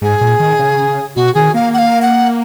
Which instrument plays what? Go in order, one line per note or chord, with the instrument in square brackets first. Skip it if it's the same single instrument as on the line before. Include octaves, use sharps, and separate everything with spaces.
[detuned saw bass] G#2 [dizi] G#4
[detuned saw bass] A#2
D#3
C#3
[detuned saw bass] B2 [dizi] F#4
[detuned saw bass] D#3 [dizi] G#4
[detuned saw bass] A#3 [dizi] F5
[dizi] F#5
F5
F#5